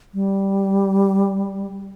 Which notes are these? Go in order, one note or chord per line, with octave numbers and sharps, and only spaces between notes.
G3